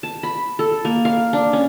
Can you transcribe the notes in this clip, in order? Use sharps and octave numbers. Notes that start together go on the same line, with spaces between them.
A5
B5
A4
A#3
F5
D4
C#4